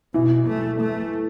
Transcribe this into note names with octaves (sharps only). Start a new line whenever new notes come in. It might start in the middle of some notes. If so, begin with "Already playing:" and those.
B2 E3
A3
A3